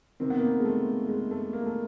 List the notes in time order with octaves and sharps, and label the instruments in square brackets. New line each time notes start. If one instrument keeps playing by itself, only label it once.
[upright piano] C3 D#3 C4
B3
A#3
B3
G#3
A3
G#3
A3
A#3
A3